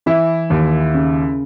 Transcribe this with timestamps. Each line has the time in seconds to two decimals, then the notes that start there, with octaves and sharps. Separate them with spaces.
0.06 E3 E4
0.50 D#2
0.94 C#3